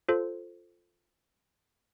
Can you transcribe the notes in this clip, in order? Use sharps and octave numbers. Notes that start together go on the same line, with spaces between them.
F4 A4 C5